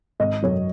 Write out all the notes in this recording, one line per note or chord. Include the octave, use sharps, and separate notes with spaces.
G#1 D#5
F#2 F#3 C#5